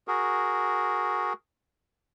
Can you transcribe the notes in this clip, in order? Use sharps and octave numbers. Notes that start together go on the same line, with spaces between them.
F#4 G#4 A#4